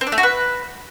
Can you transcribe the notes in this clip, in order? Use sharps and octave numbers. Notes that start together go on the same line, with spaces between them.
C4
D4
A3
F#4
B4